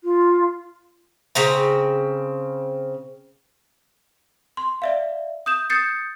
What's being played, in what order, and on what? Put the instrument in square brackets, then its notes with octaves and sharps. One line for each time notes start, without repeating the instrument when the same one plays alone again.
[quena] F4
[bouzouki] C#3 C4 A#5
[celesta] C6
D5 E5 F5
D#6 G6 E7
D#6 G6 A6 C7 C#7